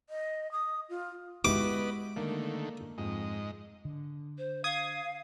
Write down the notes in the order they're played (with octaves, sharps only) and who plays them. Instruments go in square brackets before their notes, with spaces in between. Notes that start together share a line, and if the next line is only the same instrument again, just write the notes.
[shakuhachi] D#5
D#6
F4
[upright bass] G#3 [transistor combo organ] B3 B4 D#5 [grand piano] E4 F#4 G4 [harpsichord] D6
[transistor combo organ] D3 D#3 A3 [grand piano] A#3
[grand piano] F2 [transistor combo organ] G#2 D#5
[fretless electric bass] D3
[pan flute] C5
[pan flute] F5 [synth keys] D#6 G#6